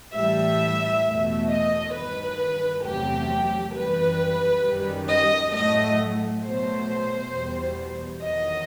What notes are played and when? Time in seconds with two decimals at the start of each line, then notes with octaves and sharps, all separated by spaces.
0.14 A2 E3 G3 E5
1.04 E2 B2 A3
1.50 D#5
1.94 G2 D#3 F#3 B4
2.84 E2 C3 F#3 A3 G4
3.74 F#2 E3 G3 B4
4.63 F#2 D#3 G3
5.08 D#5
5.52 A2 F#3 A3 D#5
6.42 B2 F#3 A3 C5
7.32 E2 B2 G3
8.21 E2 D#3 F#3 D#5